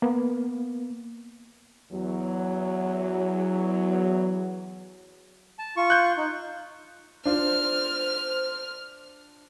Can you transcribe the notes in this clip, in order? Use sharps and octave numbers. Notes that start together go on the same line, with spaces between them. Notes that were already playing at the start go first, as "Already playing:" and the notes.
A#3 B3
E2 F#3
A5
F4 C#6
F#6 G6
D#4
D4 F4 C5 F6